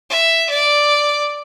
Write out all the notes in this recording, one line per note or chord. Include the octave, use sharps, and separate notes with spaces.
E5
D5